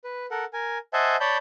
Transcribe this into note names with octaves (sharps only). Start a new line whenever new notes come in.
B4
A4 A#4 F#5
A#4 G#5
C5 D#5 E5 F#5 G#5 A5
C#5 D5 A5 B5 G6